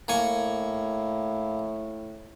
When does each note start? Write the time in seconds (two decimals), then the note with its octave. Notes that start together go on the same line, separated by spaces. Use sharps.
0.08 A2 A#3 G#5 C#6